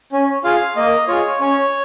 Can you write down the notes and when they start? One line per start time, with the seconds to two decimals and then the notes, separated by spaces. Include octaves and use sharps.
0.12 C#4
0.44 F4 G#4 F5
0.76 A#3 D#5
1.08 F4 G#4 C#5
1.40 C#4 C#5